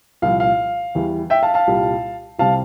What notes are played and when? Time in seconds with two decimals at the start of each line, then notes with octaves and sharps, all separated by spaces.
0.22 C2 A#2 F3 F5
0.40 F5
0.95 E2 E3 G3
1.30 E5 G5
1.43 F5 A5
1.54 F5 A5
1.67 C2 A#2 G3
2.39 C2 C3 G3 F5 A5